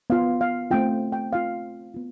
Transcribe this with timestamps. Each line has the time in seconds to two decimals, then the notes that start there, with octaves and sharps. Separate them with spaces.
0.10 B3 F4 F5
0.41 F5
0.71 A3 C4 F4 G5
1.12 G5
1.32 C4 F4 F5
1.94 B3 F4